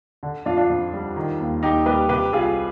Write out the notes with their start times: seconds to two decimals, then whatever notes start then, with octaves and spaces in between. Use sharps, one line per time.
0.23 D3
0.46 F2 D4 F4
0.57 D4 F4
0.70 F2
0.93 G3
1.16 D#3
1.40 D#2
1.63 D#2 D#4 G4
1.86 G3 G4 B4
2.09 C3 G4 B4
2.33 C2 F4 G#4